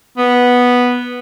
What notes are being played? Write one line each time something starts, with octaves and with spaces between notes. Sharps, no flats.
B3